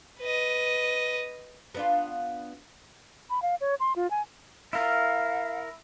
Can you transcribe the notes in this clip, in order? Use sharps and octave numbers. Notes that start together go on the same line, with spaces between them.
B4 D#5
B3 D4 F4
B5
F5
C#5
C6
F4
G#5
E4 A#4 F5